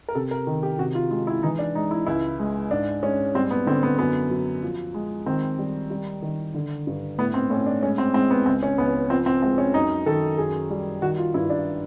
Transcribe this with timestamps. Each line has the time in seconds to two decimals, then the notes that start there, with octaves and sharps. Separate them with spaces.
0.09 A#4
0.15 C3 A4
0.31 A#4
0.47 D#3
0.63 G4
0.79 C3 F#4
0.95 F4
1.11 G#3 F4
1.27 E4
1.43 E3 D#4
1.59 D4
1.75 G#3 D#4
1.91 E4
2.07 C#2 E4
2.39 G#3
2.71 G#2 D4
3.03 G#3 C#4
3.35 G3 C4
3.51 B3
3.67 D3 C4
3.83 B3
3.98 F#2 B3
4.30 F#3
4.63 F3
4.94 G#3
5.26 D#3 C4
5.59 G3
5.90 G3
6.22 D#3
6.54 D3
6.87 G2
7.18 A2 B3
7.34 C4
7.50 A2 C#4
7.66 D4
7.83 G#3 C#4
7.98 C4
8.14 G#3 C4
8.30 B3
8.46 C#2 C4
8.63 C#4
8.78 C#2 B3
9.10 F3 C4
9.26 C4
9.42 G#3 C4
9.58 C#4
9.74 F#2 D#4
10.06 D#3 A4
10.38 F#2 G#4
10.70 G3
11.02 D#3 F#4
11.18 F4
11.34 G2 E4
11.50 D4